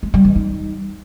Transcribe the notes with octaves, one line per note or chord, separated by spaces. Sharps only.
G#3
G3
E3
D#4